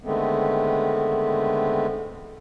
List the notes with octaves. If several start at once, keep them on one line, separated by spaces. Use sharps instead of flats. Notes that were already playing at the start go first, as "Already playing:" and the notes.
D3 D#3 G#3 A3 B3 C4